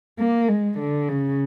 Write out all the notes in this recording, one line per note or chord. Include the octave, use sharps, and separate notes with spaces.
A#3
G#3
D3
C#3